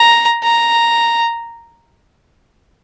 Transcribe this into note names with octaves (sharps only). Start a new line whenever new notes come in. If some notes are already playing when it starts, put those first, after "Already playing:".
Already playing: A#5
A#5